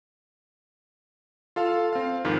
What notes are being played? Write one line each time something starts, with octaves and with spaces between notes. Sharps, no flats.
F4 A4 F5
C4 F5
F2 G#2 D#3